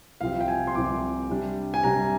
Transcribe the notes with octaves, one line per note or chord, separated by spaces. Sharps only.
C2 C3 F3 C4 F5
G5
G#5
C6
C2 C3 F3 C4 D6
C3 G3 D4
G#5
C3 G3 D4 A#5